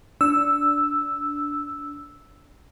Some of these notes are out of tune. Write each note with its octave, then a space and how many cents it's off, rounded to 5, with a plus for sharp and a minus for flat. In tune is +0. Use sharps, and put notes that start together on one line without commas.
D4 -15 E6 +0